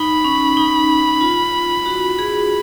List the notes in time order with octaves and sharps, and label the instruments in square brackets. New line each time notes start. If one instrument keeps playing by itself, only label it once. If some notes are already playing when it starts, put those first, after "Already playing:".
Already playing: [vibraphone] D#4 [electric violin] B5
[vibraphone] C#4
D#4
F4
F#4
G#4